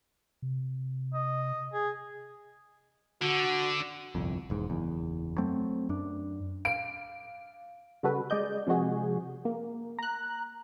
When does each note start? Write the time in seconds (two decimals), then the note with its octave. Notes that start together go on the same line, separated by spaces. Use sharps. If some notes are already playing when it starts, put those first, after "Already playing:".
0.42 C3
1.14 D#5
1.73 G#4
3.21 D3 F#4
4.15 G1 C2 F2
4.50 E1 G#2
4.70 F#1 E2
5.38 F#3 A3 C4
5.89 F#2 D4
6.65 F5 D7
8.03 C#3 G3 F#4 A4 B4
8.30 G#3 D5 D#5 G6
8.67 C3 F3 G#3 F#4 G#4
9.45 A#3
9.99 A#5 F#6